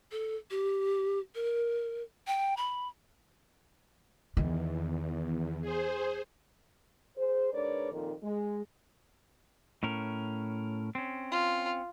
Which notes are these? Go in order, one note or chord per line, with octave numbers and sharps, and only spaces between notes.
A4
G4
A#4
G5
B5
E2 D#3
G#4 C5
G#4 C5
G#2 D4 A#4 B4 C#5 D5
F2 A#2 D#3
G#3
A2 C#4 A#4
C4 C#4
F4